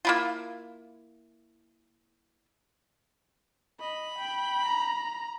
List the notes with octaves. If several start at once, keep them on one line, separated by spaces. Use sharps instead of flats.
A#3 E4 F4
D#5 B5
G5
A#5